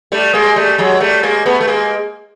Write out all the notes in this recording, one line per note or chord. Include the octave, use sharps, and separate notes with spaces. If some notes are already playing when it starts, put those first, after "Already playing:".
G3 A3
G#3 A#3
G3 A3
F#3 G#3
G3 A3
G#3 A#3
A3 B3
A3
G#3 A#3